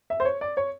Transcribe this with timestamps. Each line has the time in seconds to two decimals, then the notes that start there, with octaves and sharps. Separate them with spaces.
0.10 E5
0.20 C5
0.25 C#5
0.41 D5
0.57 C#5